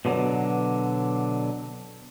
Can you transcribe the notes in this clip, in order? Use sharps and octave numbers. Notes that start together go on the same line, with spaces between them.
B2 D3 F#3